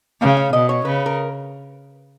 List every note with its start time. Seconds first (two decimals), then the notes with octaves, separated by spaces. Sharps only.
0.21 C#3 F5
0.37 F5
0.53 B2 D#5
0.69 C#5
0.85 C#3 B4
1.06 A#4